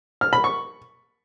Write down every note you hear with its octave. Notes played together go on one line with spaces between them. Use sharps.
F6
B5
C#6